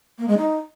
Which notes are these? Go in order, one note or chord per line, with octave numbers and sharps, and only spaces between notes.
A#3
G#3
D#4